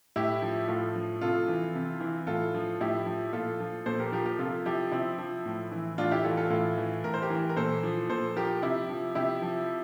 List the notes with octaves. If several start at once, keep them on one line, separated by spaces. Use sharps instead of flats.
A2 E4 G4
F3
A2 F4 A4
F3
C3 F4 A4
E3
C3
E3
A2 F4 A4
F3
A2 E4 G4
F3
A#2 F4 A4
F3
A#2 A4 C5
G4 A#4
F3 G4 A#4
G4 A#4
C3 F4 A4
F3 E4 G4
C3 C4 E4
F3
A2
E3
A2 D4 F4
E4 G4
E3 F4 A4
F4 A4
A2 F4 A4
E3
A2 A#4
C5
G4 A#4
E3
A#4
A#2 A4 C5
F3
A#2 A4 C5
F3 G4 A#4
C3 E4 G4
F3
C3 E4 G4
F3